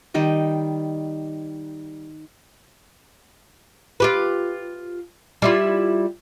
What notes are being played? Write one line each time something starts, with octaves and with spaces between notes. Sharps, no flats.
D#3 G3 D#5
F4 G4 B4
G3 E4 F4